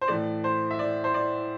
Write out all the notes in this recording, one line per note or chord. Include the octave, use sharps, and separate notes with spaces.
C5
A2 E3 A3 D5
C5
E5
D5
C5
D5